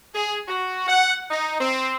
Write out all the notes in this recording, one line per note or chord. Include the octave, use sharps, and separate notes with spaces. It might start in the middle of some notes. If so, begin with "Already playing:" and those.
G#4
F#4
F#5
D#4
C4